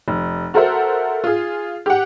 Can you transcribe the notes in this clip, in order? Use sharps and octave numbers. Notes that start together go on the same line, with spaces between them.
F1
F#4 A4 A#4 C5 E5 F#5
F4 G#4
G4 F#5